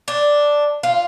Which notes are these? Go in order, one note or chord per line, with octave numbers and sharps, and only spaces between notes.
D4
F4